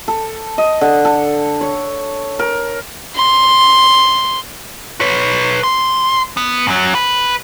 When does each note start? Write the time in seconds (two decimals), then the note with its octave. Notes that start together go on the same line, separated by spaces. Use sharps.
0.08 A4
0.58 D#5
0.81 D3
1.05 A4
1.61 C#5
2.39 A#4
3.15 C6
5.01 B4 C#5
5.64 C6
6.37 B3
6.67 F#2 F#3
6.95 B4